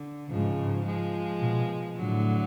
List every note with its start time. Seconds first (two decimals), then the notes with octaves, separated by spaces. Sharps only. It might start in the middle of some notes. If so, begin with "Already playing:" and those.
Already playing: D3
0.30 G#2 C#3 F3
0.86 F3 G#3
1.41 B2
1.96 A2 D3 F#3